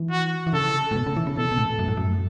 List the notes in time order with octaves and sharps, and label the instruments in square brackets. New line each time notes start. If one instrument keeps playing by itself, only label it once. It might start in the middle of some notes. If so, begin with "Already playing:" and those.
Already playing: [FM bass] E3
[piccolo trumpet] F#4
[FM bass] E3
[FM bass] C#3 [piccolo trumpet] A4
[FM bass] A2
B2
C#3
E3
C#3
[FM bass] B2 [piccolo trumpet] A4
[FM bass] B2
A2
F#2
A2
F#2